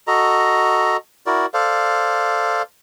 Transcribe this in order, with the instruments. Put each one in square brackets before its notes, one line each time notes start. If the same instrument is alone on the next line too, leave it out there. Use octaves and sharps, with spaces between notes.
[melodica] F#4 A4 D#5 A#5
E4 F#4 A#4 D5
A4 C5 D5 F5